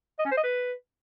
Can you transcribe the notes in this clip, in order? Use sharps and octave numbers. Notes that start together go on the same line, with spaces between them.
D#5
C#4
C5
D#5
B4